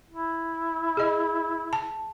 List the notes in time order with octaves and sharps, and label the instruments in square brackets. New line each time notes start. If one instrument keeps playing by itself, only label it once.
[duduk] E4
[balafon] G#4 D#5
A5